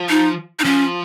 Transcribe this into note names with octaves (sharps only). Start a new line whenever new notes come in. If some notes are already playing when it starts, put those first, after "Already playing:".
Already playing: F3
D#4
D#4
F3 C#4